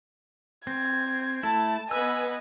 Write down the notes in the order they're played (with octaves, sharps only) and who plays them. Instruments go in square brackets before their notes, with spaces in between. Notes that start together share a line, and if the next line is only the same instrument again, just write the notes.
[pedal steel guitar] C4 [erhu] G#6
[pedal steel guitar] A3 E4 [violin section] A5
[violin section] B3 B4 G#5 [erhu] D#5 [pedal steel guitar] E6